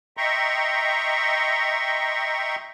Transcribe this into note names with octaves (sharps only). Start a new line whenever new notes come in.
D#5 E5 G5 A#5 C6 C#6